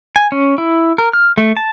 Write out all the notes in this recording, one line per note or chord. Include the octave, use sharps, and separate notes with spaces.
G#5
C#4
E4
A#4
F6
A3
A5